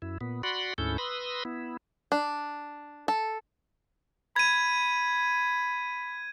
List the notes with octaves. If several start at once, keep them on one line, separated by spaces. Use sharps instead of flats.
F#2 E4
A#2 B3
F#4 D5 F#5 B5 C6
D2 G#2 C#4 E4 A4 G6
B4 B5 C6 D#6 E6 A#6
B3 E4
D4
A4
B5 G#6 D#7